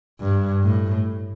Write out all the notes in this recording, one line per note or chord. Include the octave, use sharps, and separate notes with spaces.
G2
A2